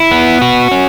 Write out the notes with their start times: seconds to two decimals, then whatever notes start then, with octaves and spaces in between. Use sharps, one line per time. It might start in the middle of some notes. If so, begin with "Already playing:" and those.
Already playing: E4
0.11 B3
0.42 F#4
0.71 C#4